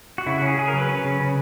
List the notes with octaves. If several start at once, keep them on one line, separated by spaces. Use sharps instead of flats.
F#4
C#3 E4
F#4
C#4
G#4
C#3 G#4
A#4
F#3 B4
C#4
C#3
C#3